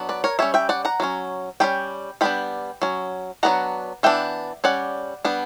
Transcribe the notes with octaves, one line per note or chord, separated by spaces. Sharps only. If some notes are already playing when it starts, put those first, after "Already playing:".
Already playing: F#3 B3 D4
B4 D5
A#4 C#5
G3 C#4 C#5 E5
E5 G5
D5 F#5
F#5 A#5
F#3 A#3 C#4
G3 A#3 C#4 G5 B5
G3 B3 D4 G5 B5
F#3 C#4
F#3 B3 D4 F#5 A#5
E3 B3 D4 E5 G5
G3 C#4 D5 F#5
G3 B3 D4